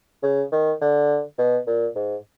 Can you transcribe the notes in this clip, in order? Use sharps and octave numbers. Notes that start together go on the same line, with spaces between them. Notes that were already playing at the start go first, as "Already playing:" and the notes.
C#3
D#3
D3
B2
A#2
G#2